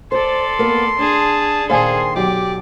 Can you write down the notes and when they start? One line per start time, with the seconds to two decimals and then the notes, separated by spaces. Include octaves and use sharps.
0.12 A4 C5 D5 C6
0.59 A#3 B3
0.99 D4 G#4 A5
1.70 A#2 D#3 G#4 A4 C5 F5 G#5 C6
2.16 B1 G4 D5